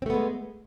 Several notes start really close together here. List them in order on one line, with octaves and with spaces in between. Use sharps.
C4 A3 B3 G#3